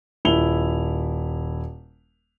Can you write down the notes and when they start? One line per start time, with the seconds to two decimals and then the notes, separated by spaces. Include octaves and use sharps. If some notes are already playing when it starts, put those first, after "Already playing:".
0.25 D#1 E4 F7 G7